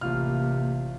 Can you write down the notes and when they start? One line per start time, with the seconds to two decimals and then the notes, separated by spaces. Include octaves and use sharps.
0.01 A1 C3 A#3 F4 F6